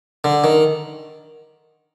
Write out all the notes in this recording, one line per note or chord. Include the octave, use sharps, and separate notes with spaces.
D3
D#3